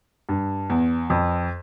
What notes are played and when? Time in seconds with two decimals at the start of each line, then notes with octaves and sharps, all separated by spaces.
0.29 G2
0.70 E2
1.10 F2